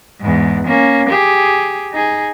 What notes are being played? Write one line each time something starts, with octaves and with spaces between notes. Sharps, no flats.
E2 G#2
A#3 C#4
G4 G#4
D#4 G#4